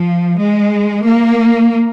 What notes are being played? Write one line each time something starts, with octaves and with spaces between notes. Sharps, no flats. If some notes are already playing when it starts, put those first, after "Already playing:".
Already playing: F3
G#3
A#3